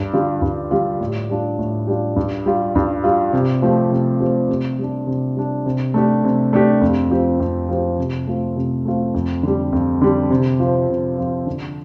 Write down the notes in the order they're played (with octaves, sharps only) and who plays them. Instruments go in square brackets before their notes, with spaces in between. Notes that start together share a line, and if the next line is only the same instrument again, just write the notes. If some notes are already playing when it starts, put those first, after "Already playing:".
Already playing: [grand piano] G2
D3 G3 F4
G2
D3 G3 F4
A2
G3 D4 F4
A2
G3 D4 F4
G2
G3 F4
G2
G3 F4
C3
F3 A3 C4 G4
C3
F3 A3 C4 G4
C3
G3 D4
C3
G3 D4
C3
A3 D4 G4
C3
A3 D4 G4
F2
F3 C4 G4
F2
F3 C4 G4
C3
A3 C4 F4
C3
A3 C4 F4
F2
D3 G3
F2
D3 G3
C3
F3 C4
C3
F3 C4
D3